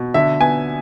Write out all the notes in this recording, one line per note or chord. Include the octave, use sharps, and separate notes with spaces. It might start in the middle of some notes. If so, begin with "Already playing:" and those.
Already playing: B2
D3 E5
B3 G#5